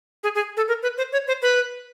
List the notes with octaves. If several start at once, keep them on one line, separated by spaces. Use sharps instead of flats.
G#4
G#4
A4
A#4
B4
C5
C#5
C5
B4